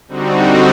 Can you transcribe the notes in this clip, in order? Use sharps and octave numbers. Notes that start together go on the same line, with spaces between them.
D3 G3 C4 D#4 F#4